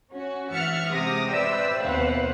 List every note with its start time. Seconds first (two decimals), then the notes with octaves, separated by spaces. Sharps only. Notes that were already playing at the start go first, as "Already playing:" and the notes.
0.11 C#4 F#4
0.52 E3 E5 F#5 F6 A6 C#7
0.88 C3 G#3 D6 D#6 A#6
1.31 B4 C5 D5 E5 G5 E6
1.82 D#2 B2 C4 B4 F5 F#5